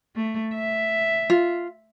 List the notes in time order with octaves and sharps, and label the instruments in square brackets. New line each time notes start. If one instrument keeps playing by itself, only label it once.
[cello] A3
E5
[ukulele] F4